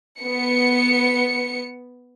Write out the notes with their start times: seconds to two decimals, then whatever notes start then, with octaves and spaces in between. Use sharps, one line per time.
0.21 B3 C#7